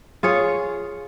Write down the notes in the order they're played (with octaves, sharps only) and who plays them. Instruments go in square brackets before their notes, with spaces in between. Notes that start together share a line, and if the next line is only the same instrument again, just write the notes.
[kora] F4 G#4 C#5